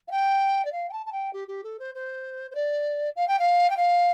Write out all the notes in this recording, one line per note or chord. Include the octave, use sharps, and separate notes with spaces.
F5
G5
D5
F5
G5
A5
A5
G5
G4
G4
A4
C5
C5
C5
D5
F5
G5
F5
G5
F5